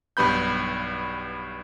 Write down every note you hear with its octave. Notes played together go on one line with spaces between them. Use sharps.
B1 G2 B3 B5 G6